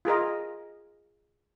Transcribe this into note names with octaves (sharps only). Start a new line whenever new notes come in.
F4 G#4 A#4 D#5